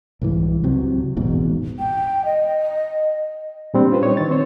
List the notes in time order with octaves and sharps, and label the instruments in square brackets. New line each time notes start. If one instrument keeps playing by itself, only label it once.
[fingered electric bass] C2 G#2 E3
C#2 C3 F#3 C4
A1 E2 G#2 B2
[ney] G5
D#5
[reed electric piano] A#2 G3 C4 D4
C#4 F4 B4 C5
D#4 C#5
D#3 A6
C4 C5 C#5